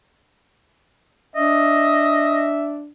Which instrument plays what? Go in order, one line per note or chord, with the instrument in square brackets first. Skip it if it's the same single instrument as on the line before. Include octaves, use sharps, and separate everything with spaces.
[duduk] D4 [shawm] D#5 [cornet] E5